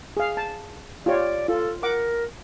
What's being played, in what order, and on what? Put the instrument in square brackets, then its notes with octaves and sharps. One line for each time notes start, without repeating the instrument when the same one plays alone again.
[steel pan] G#4 F5
A5
[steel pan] F4 G4 C#5 [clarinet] D5
[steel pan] F4 [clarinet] A4
[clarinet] A#4 [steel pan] F#5 D6